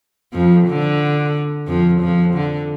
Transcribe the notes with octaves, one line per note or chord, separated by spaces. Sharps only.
F2 F3
D3
F2 F3
F2 F3
D3